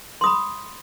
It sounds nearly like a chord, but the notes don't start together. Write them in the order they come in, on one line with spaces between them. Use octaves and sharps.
C6 D#6 B5